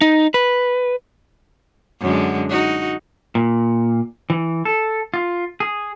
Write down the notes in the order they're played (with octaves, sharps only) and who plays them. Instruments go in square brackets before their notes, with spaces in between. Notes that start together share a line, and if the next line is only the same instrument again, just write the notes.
[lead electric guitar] D#4
B4
[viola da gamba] F#2 D3 G#3
D#4 F#4
[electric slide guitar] A#2
E3
A4
F4
G#4